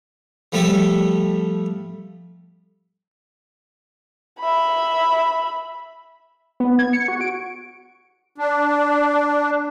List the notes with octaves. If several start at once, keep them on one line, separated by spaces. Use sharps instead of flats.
F3 G3 A3 G4 A4
E5 B5
B3
G#6
C#7
F#4
D7
D4